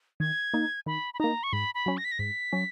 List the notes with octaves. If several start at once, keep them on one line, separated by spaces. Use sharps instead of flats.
D#3 G#6
A#3 D#4
D#3 B5
B5
A#3 D#4 A#5
C#6
G#2 B5
B5
F#3 C#4
A#6
B6
A#6
G#2 B6
F#3 C#4